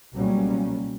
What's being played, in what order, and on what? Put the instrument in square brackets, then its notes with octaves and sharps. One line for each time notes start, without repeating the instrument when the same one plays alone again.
[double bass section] C#2 B2 F#3 G3 A#3 C#4